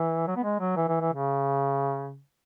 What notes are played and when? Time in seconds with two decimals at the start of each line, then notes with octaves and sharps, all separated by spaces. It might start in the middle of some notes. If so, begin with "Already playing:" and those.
Already playing: E3
0.27 F#3
0.36 B3
0.44 G#3
0.60 F#3
0.76 E3
0.88 E3
1.01 E3
1.13 C#3